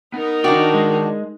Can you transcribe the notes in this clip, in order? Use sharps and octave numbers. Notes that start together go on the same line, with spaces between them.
B3 D#4 A#4
D#3 D4 F#4 D5 G5
G#3